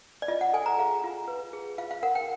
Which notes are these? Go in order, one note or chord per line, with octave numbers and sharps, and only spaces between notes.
D5
F4 D#5
F#5
A4 G#5
A#5
G#4 F5
F4
B4
G#4
F4 F5
F5
A#4 F#5
G5